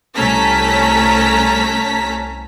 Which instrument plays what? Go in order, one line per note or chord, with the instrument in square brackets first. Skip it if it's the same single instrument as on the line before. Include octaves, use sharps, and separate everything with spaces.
[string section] C2 A3 C#4 A5 A#5 B6